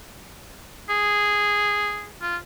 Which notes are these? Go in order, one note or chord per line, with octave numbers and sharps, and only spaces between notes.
G#4
F4